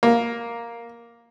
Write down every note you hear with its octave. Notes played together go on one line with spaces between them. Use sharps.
A#3